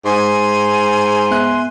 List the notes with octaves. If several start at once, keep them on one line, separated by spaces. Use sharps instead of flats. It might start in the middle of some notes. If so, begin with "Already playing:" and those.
G#2 G#5 C6
B3 E5 F#6